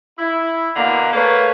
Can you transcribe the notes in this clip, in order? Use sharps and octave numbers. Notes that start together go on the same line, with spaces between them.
E4
B2 D3 A#3
A3 A#3 B4 C#5